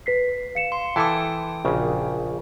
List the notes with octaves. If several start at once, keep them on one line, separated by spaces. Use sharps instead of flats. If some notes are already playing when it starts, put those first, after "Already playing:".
B4 B6 C7
F5 C#7 E7
C6
E3 E4 A4 G5 A5 D6 D#6
A#1 C#3 F#4